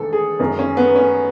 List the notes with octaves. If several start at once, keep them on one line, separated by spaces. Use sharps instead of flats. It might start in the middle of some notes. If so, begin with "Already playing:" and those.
Already playing: E1 E2 D#3 G#3 A4
G#4
F#1 F#2 D#3 G#3
C#4
B3
C#4